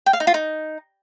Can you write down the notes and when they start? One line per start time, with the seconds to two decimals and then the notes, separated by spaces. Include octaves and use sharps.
0.06 G5
0.13 F5
0.20 D#4
0.27 F4
0.34 D#4